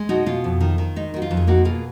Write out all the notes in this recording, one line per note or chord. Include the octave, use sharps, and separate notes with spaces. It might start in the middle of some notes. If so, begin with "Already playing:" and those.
Already playing: G#3
B2 D#4 F#4
B2 F4
F2
D#3
D#3
G#3 D#4
D#3 F#4
F4
F2
G#4
A#3 D#4 F#4
B2 F4 G#4